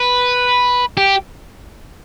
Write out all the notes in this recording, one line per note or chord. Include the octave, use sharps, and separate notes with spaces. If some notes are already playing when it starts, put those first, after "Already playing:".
Already playing: B4
G4